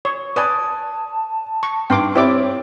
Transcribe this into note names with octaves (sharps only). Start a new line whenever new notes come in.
C#5
B4 D5 G#5 A5 D#6
C#6
G2 D#4 G5 C6 D6
C4 E4 G4 C#5 D5 D6